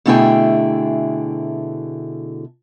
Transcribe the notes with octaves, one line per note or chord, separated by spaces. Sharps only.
B2 D3 A3 E4 G#4 G5